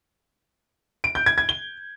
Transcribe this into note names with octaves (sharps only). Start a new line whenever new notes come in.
D7
G6
G#6
G#6
G7